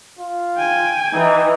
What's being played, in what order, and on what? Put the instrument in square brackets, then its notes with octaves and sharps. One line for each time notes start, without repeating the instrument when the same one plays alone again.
[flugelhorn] F4
[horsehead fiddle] G5 G#5
[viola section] E3 [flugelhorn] D#4